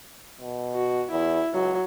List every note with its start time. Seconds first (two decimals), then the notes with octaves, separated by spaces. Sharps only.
0.41 B2
0.74 F#4
1.11 E2 E4
1.53 C#2 F#3